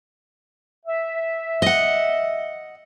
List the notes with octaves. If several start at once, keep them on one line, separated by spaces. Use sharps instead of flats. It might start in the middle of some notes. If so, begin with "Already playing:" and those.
E5
D#5 F#5